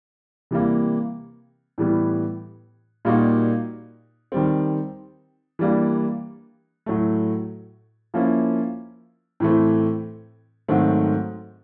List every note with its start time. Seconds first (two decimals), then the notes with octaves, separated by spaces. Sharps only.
0.51 C3 E3 G3 A#3
1.78 A2 E3 G3 B3
3.05 A#2 G3 A#3 D#4 F#4
4.32 D#3 G3 C4
5.59 E3 G3 A#3 D4
6.86 A2 F#3 A3
8.14 F3 A#3 C#4 E4
9.40 A2 E3 A3 C4
10.68 G#2 D#3 F#3 A3 C4